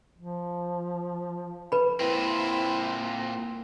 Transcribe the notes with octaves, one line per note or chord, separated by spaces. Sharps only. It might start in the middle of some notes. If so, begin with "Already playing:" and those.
F3
B4 B5
A#2 C4 E4